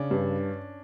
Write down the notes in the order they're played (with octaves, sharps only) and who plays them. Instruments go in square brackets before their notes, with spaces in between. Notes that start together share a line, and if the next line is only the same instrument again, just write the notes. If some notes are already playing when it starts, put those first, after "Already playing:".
Already playing: [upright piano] C#3 [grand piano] C#4 D4
[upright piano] G2